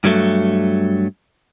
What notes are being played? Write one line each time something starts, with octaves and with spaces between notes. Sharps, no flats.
G2 F#3 A3